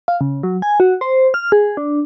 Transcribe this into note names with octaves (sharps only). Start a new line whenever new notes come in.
F5
C#3
F#3
G#5
F#4
C5
F6
G#4
D4